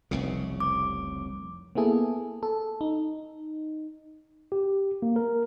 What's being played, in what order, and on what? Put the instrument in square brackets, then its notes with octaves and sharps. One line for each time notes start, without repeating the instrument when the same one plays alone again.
[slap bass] F1 C2 C#3
[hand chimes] D6
[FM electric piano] A#3 B3 E4 G#4 A4
A4
D#4
[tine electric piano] G4
A#3
A#4